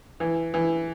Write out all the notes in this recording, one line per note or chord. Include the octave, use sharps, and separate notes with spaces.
E3
E3